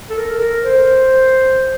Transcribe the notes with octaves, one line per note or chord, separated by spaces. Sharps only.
A4
A#4
A4
A#4
C5